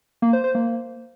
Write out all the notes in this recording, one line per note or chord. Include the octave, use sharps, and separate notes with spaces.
A#3
C5
C5
A#3